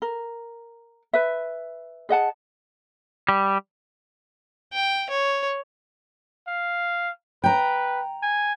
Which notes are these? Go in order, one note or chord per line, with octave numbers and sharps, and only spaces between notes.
A#4
B4 E5
G#4 D#5 F#5 A5
G3
G5
C#5
F5
B4 G5 A#5
G#5